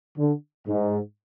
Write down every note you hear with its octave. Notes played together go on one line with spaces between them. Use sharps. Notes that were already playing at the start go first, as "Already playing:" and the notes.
D3
G#2